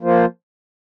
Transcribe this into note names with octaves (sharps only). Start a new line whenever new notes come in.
F3 A#3 F4 C5